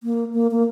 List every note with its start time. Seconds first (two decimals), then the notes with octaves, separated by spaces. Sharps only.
0.03 A#3
0.33 A#3
0.51 A#3